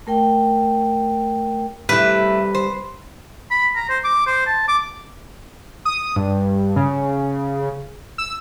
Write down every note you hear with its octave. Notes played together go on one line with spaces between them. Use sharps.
A3 A#4 G5
C3 G3 A3 E4 B4
C5
B5
A#5
C5
D6
C5
A5
D6
D#6
G2
C#3
E6